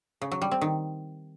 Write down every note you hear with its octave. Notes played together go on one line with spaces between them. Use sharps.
C#3
F#3
G3
C4
D#3